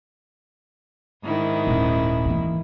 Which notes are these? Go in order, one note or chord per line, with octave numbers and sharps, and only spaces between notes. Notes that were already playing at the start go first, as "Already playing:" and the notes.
G#2 D#3 E4
D#1
E3 A#3